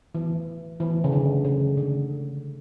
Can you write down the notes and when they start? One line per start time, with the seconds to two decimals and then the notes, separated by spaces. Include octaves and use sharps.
0.15 E3
0.80 E3
1.04 C#3
1.12 D3
1.45 C#3
1.77 D3